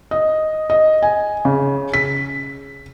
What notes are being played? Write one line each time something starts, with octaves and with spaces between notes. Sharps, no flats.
D#5
D#5
G#5
C#3
B6